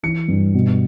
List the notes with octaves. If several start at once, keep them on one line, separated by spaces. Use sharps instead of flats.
E3 C#7
G2
B2